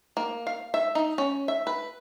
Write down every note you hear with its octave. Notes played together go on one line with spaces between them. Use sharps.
A#3
F5
E5
D#4
C#4
E5
B4